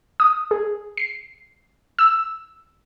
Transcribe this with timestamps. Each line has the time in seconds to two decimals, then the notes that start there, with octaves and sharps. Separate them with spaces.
0.20 D#6
0.51 G#4
0.97 C7
1.99 E6